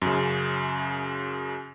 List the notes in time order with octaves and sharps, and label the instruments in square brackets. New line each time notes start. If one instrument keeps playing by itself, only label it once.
[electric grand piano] F#2 C#3